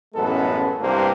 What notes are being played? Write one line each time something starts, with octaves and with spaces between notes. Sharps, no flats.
A1 F#2 G#3 B3 A4
C2 G2 A#3 G4 C5